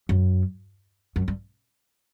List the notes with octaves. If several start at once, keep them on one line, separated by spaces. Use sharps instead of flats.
F#2
F#2
G2